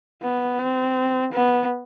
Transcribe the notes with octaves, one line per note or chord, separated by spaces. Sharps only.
B3
C4
B3